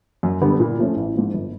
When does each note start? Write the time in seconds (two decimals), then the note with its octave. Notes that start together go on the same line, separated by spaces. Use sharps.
0.23 F#2
0.41 D3 G3 B3 D4
0.60 A#2
0.79 F3 A3 C#4
0.96 A1
1.15 G#2 F3
1.34 G1